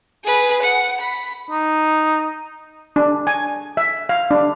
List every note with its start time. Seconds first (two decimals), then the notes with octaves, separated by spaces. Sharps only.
0.25 G#4 B4
0.62 F#5
1.00 B5
1.50 D#4
2.96 D4
3.27 G#5
3.77 E5
4.09 F5
4.31 D4